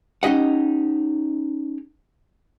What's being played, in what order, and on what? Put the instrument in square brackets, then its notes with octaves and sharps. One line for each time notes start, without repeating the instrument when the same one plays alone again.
[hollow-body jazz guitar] C#4 D#4 G4 D#5 F#5